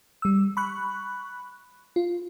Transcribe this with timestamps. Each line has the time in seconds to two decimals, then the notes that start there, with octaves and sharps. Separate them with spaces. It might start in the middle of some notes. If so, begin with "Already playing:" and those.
0.22 G3 E6
0.57 B5 C#6 F#6
1.96 F4